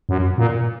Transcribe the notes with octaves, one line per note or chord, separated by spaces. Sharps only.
F#2
A#2